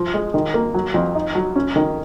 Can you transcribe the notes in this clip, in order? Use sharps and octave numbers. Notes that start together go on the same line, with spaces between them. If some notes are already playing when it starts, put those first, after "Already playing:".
Already playing: F3
G#3
D#3
A#3
F#3
F2
D#4
F#3
C#4
D#3